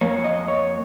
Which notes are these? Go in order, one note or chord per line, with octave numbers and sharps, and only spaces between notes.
F2 F3 A#3 C#5
D#5
C#5